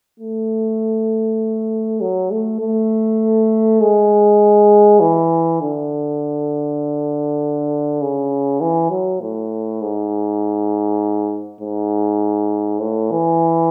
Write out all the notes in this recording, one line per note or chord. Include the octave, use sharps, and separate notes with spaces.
A3
F#3
A3
A3
G#3
E3
D3
C#3
E3
F#3
A2
G#2
G#2
A2
E3